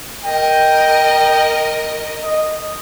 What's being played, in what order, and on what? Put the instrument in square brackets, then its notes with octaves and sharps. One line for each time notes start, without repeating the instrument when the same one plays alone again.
[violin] A#4 D#5 [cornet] G5
[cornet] D#5